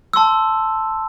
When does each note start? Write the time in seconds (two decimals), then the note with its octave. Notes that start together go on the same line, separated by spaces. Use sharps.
0.13 A5 C6 E6